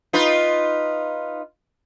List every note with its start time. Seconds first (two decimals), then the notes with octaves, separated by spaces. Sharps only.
0.13 D#4 F4 B4